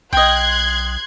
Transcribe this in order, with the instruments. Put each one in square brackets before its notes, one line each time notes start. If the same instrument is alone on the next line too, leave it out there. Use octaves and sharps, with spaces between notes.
[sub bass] B1 [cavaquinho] D#5 G5 [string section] C6 F#6 G#6